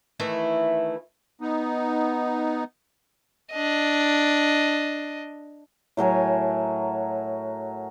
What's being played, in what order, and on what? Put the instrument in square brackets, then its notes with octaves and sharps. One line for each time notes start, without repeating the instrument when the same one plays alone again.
[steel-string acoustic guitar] D#3 E3 A3 E4
[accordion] B3 D#4
[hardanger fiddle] D4 D#5
[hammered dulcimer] A2 F#3 A#4 G#5